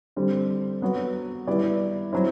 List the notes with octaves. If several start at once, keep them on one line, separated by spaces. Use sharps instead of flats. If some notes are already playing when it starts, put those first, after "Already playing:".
D3 G3 C4
F#3 B3 F#4
G3 B3 E4 B4 D5
F#3 C4 E4